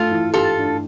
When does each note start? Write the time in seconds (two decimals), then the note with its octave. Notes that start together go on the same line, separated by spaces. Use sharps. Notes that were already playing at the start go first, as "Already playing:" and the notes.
Already playing: A3 F4 A4
0.11 E3
0.34 F4 G4 A4
0.58 D4